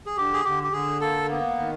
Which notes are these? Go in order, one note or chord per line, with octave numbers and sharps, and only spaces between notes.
G#4
D3 G4
G#4
D3 G4
G4
D3 G#4
A#3 A4
B3
D#3